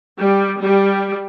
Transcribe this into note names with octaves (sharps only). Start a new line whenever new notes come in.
G3
G3